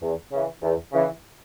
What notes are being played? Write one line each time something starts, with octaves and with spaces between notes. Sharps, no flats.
E2
C#3 E3
E2
C#3 E3